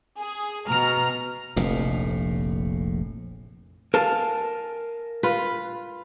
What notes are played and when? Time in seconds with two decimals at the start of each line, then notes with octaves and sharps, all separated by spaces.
0.17 G#4
0.68 B2 A#5 F6
1.56 F1 A#1 A2
3.94 A#4 F5 G#5 A5
5.23 F4 B4